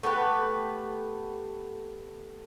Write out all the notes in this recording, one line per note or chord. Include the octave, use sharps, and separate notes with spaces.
A3 B3 G4 B4